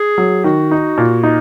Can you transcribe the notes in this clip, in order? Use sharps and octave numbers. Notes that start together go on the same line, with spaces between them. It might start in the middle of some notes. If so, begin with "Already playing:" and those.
Already playing: G#4
F#3
D#3 F#4
D#4
A#2
D#4